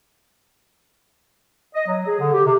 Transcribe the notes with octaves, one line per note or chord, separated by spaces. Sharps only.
D#5
F#3
G#4
D3
G4
C3